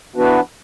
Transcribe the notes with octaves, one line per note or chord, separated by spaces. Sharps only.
E3 B3 D4 F#4 B4